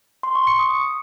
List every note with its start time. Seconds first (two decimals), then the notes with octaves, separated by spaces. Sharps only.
0.23 C6
0.35 C#6
0.47 C#7
0.59 D#6